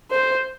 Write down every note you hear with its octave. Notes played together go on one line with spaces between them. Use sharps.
C5